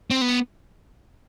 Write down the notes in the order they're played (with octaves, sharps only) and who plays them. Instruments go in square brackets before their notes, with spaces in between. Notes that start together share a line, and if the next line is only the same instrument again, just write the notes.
[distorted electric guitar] C4
B3